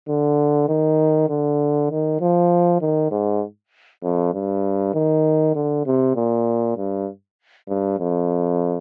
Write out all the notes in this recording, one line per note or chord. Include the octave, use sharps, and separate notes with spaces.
D3
D#3
D3
D#3
F3
D#3
G#2
F2
G2
D#3
D3
C3
A#2
G2
G2
F2